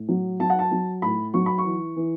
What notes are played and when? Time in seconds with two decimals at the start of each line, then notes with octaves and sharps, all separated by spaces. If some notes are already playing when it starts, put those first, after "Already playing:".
Already playing: A2
0.09 F#3
0.40 F#3 A5
0.50 F#5
0.59 A5
0.71 F#3
1.02 A2 B5
1.34 F#3 C#6
1.46 B5
1.58 C#6
1.65 E3
1.96 E3